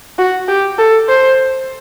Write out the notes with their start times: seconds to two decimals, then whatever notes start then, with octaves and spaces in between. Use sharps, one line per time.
0.18 F#4
0.48 G4
0.78 A4
1.08 C5